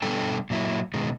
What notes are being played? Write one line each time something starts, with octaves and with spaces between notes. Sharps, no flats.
B2 G3 D4 A4 G5
A#2 F#3 E4
B2 D#3 G#3